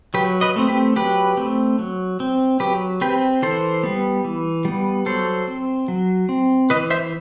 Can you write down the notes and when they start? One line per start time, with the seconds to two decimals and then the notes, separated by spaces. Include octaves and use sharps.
0.14 F#3 G4 B4
0.41 B4 D#5
0.56 A3 C4
0.69 G4 B4
0.96 F#3 G4 B4
1.37 A3 C4
1.79 F#3
2.20 C4
2.60 F#3 G4 B4
3.01 C4 G4 B4
3.42 E3 A4 C5
3.83 G3 B3
4.24 E3
4.65 G3 B3
5.06 F#3 A4 C5
5.48 C4
5.88 F#3
6.29 C4
6.70 E3 B4 D#5
6.90 C5 E5